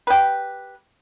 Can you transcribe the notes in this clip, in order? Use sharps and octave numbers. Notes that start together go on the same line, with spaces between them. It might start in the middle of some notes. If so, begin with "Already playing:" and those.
G4 B4